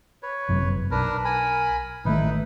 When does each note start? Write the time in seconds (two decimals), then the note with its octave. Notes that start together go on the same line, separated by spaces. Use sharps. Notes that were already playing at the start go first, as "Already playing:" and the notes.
0.23 B4 C#5
0.49 G1 F#2 C3
0.91 B1 D4 A#4 B4
1.25 A#4 G#5 B5
2.05 A1 D#3 A3 D#4 E4 B4